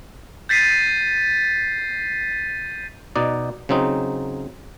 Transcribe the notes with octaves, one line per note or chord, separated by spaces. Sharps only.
G6 A6 B6 C7 D#7
B2 D#4 D5
C#3 F#3 C4 D#4